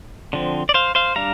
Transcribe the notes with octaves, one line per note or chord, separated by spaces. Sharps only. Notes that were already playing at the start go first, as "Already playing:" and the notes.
D3 F3 C4
D5
C5 F5
C5 F5
G3 D4 F5 A#5